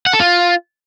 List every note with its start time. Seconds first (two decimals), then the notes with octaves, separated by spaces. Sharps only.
0.06 F#5
0.13 A4
0.20 F4